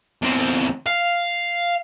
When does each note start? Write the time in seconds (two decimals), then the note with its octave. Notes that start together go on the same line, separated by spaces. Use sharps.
0.22 E2 C4
0.86 F5